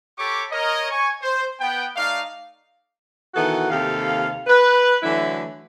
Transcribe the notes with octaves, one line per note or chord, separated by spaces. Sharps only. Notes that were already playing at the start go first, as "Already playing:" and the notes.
G4 A4 C#5 B5 C#6 D6
A#4 C#5 D#5
G#5 C#6
C5
B3 G5
A3 D#4 D5 F5
B2 D#3 E3 B3 F#4 A4
D#2 C3 G4 A4 F5
B4
D3 E3 F#3 A3 E4 E5